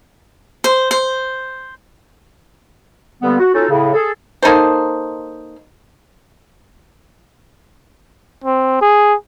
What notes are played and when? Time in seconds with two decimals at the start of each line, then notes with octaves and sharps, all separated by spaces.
0.64 C5
0.91 C5
3.22 G2 D3 G3 A#3 B3
3.40 F#4
3.54 C#4 D#4 F4 F#4 A4
3.70 A2 C#3
3.94 G#4 A4
4.42 A#3 D#4 A4 C5
8.44 C4
8.81 G#4